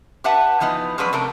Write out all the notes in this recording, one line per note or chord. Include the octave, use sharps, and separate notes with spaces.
G4 B4 E5 F#5 A5
E3 F3 B3 D#4
F3 F#3 G#3 C#4 B4 D5
C3 A3 A4 A#4